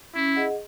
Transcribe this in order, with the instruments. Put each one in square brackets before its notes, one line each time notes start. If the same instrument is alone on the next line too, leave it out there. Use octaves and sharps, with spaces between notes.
[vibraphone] C#4 [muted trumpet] E4
[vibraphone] G#4 D#5 F#5